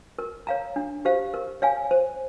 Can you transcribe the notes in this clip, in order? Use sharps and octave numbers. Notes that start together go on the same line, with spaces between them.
A#4
C#5 F5 A#5
D4
G4 C5 F5
A#4
C#5 F5 G#5
C5